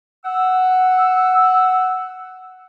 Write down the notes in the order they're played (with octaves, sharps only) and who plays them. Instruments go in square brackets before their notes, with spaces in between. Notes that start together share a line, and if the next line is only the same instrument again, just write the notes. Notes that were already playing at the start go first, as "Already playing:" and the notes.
[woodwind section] F#5 E6